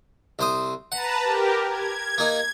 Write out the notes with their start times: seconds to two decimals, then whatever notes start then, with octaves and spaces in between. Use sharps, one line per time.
0.39 C2 C5 D#6
0.92 B4 F#5 A5 A#5
1.23 G4 A#4
1.66 G#6
2.18 A#3 D#4